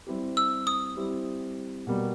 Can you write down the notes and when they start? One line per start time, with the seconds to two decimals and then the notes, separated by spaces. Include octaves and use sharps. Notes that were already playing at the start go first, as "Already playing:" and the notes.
0.07 G3 C4 E4 G4
0.37 E6
0.67 D#6
0.97 G3 C4 E4 G4
1.87 B2 G3 A#3